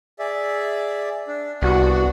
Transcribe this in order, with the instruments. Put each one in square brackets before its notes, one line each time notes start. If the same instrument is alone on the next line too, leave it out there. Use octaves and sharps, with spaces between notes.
[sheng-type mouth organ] G#4 D5 E5
D4
[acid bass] C2 [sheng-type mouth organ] B3 D4 [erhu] F#4